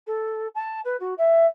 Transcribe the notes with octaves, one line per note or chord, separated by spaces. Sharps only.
A4
A5
B4
F#4
E5